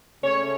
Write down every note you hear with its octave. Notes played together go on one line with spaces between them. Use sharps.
C#3 A3 C#4 C#5